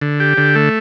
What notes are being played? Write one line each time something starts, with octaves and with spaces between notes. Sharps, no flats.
D3
G4
D3
A3